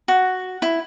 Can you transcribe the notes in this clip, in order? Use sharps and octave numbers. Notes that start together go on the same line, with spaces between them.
F#4
E4